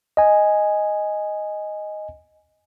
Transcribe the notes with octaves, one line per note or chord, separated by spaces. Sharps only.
D#5 G#5